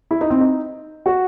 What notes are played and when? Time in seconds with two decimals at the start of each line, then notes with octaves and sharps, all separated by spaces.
0.11 E4
0.21 D#4
0.30 C4
0.40 D#4
1.06 F#4